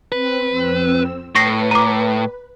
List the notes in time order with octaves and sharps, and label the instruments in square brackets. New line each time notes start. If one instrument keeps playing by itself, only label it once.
[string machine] C4 [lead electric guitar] B4
[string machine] F2 C4 E6
[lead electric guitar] A2 [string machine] B4 [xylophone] C#6 A#6 C7
[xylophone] A#5 D6